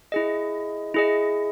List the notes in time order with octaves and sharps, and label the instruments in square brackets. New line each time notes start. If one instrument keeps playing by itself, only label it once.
[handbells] E4 G#4 D#5
E4 G#4 D#5